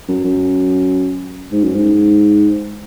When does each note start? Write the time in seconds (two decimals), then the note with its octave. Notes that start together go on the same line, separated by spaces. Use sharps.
0.08 F#2
0.24 F#2
1.52 G#2
1.64 F#2
1.75 G#2